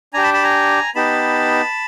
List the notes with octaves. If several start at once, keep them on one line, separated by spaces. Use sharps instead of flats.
D4 G4 G#5 A#5
A5 B5
A5 B5
G#5 A#5
B3 D#4 G4 A5 B5